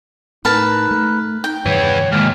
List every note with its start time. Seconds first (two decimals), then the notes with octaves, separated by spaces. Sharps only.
0.45 A2 D#4 A#4 B4 A5
0.91 A3
1.44 D#4 G5
1.66 G2 C3 D#3 E3 B3 C#5
2.12 D#2 G#2 F6